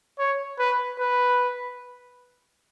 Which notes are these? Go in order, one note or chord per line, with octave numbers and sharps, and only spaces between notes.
C#5
B4
B4